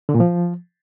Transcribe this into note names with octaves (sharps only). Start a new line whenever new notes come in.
D3
A#2
F3